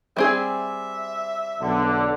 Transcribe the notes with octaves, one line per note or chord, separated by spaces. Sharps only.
G3 C4 G#4 E5
B1 D3